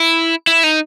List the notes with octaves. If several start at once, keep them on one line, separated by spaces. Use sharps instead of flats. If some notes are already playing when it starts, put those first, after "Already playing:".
Already playing: E4
E4
D#4